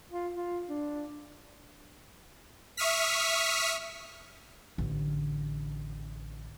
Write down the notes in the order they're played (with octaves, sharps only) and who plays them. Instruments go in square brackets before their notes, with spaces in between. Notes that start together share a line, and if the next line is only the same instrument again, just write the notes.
[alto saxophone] F4
F4
D4
[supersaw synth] E5 C#6 D#6 F6 B6
[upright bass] A1 D3